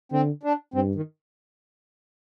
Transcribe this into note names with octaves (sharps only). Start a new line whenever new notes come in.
D3 C4
D4
G2 C4
D#3